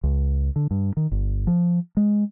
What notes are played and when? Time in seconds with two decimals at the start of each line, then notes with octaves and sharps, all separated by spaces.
0.04 C#2
0.56 D3
0.71 G2
0.97 D#3
1.12 G1
1.47 F3
1.97 G#3